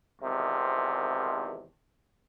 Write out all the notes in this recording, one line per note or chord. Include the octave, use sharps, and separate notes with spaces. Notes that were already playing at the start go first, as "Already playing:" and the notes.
G#1 E2 C3 D#3 F3